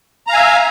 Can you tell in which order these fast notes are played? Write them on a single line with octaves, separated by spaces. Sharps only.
A#5 F5 G#5 E5